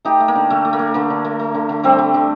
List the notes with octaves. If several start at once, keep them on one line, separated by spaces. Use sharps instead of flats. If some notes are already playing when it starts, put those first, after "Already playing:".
A3 D#4 G4
A3
A#3
D3
D3 A3
A3
A#3
A3
D3 A#3
D3
A3
A3
D3
D3
G3 A3 C4
G3
D3